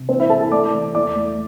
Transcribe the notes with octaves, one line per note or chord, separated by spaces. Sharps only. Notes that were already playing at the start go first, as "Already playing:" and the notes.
Already playing: C3
E3 C4 C5
E4 E5
C2 A4 A5
A4 A5
A3 D5 D6
E3
E2 D5 D6
A3